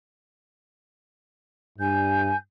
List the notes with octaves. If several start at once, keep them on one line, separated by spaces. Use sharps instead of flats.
G2 G#5 G6